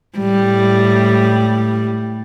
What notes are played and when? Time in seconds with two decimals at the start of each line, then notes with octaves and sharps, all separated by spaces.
0.18 A2 G3